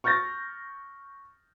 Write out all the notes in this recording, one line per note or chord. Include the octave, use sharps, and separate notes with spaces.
C#6 F6 G6 A6 A#6